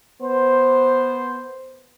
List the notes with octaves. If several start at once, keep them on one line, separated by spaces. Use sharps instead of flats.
B3 C5